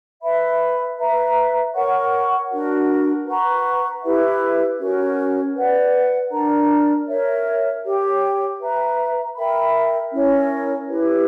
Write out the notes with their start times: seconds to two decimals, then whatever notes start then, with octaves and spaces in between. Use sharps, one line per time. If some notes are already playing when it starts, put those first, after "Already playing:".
0.22 B4 E5 B5
0.97 B4 E5 A#5
1.74 A#4 C#5 F#5 C#6
2.51 D4 F#4 A#4
3.26 B4 F#5 A#5 C#6
4.02 E4 G4 B4 E5
4.79 C#4 F#4 A#4 C#5
5.55 B4 D5 F#5
6.30 D4 A#4 D5 A#5
7.08 A#4 C#5 E5
7.84 G4 C#5 G5
8.60 B4 E5 A#5
9.36 A#4 E5 G5 B5
10.12 C#4 E4 A#4 C#5
10.89 E4 G4 B4